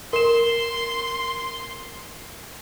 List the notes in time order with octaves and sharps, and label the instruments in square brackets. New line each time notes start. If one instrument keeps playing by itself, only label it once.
[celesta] A#4 E7 [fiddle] C6